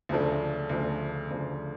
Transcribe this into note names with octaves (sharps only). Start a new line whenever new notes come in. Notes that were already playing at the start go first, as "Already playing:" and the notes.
D2 C#3 F3 A3 D4
D2 C#3 F3 A3 D4
D2 C#3 F3 A3 D4